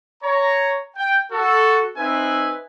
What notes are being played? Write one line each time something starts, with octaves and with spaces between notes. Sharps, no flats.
C#5 A#5
G5
F#4 A4
C4 D#4 B4 E5 G#5